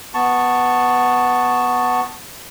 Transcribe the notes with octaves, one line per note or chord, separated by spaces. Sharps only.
B3 A5 C#6